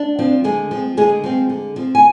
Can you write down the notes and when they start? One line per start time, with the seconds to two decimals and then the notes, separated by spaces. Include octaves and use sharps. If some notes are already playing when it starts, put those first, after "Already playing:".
Already playing: D4
0.19 F3 C4
0.44 D3 G#3 G#4
0.71 F3 C4
0.97 D3 G#3 G#4
1.24 F3 C4
1.49 D3
1.76 F3 C4
1.95 G#5